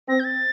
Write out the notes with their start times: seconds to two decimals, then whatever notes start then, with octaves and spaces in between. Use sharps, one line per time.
0.08 C4 A#6
0.20 G6
0.24 A6